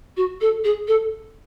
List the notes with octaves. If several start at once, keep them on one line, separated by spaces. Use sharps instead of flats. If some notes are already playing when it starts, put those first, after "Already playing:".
F#4
A4
G#4
A4